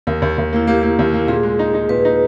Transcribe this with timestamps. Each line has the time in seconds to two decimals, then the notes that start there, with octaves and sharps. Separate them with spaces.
0.07 D#2 A#4
0.22 D#2
0.38 D#2
0.53 A#3 E4
0.67 A#3 G4
0.83 A#3
0.99 D#2
1.13 A#3
1.28 A#2 G#4
1.43 G#3
1.59 D#4
1.74 D#4
1.89 A#2 B4
2.05 D#4